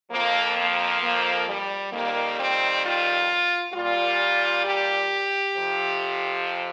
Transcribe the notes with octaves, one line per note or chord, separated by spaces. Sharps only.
F2 F3 A#3
A#3
A#3
G3
F2 D#3 G3 A#3
C4
F4
A#2 G3 F4
G4
F2 C3 F3